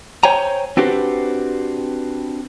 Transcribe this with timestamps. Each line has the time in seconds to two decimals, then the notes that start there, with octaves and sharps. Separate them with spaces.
0.23 C5 C#5 G5 G#5 A#5
0.77 C4 D4 F#4 G4 B4 C5